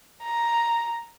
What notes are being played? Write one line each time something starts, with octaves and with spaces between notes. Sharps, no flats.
A#5